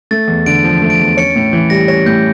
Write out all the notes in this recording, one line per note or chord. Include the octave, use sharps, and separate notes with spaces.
A3 A6
E2
D3 D7
F3
A3
D7
E2
C#4 C#7
A2
E3
G3 A#6
C#4 A#6
A2 G6